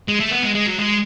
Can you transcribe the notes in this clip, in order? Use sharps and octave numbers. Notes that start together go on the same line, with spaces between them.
G#3
A3
B3
G#3
G#3
F#3
G#3